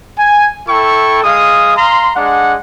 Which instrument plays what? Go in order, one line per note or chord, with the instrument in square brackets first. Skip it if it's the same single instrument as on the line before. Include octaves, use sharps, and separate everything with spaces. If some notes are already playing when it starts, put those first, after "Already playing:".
[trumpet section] G#5
E4 A4 G5 C#6
G#3 F5 D#6
F5 A#5 C6
G#3 D4 F#5